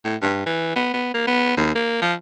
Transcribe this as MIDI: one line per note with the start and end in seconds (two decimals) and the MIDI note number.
0.05 0.16 45
0.22 0.42 43
0.46 0.73 52
0.76 0.93 59
0.94 1.10 59
1.14 1.27 58
1.27 1.53 59
1.57 1.71 39
1.75 1.97 58
2.02 2.14 53